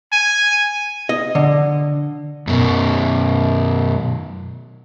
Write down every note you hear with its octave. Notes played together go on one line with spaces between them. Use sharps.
G#5
D#5
D3
F#2 B2